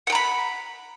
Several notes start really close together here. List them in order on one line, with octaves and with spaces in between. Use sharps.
F#5 G5 A#5 B5